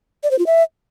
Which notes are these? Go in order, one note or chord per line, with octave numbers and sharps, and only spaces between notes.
D5
C5
F4
E5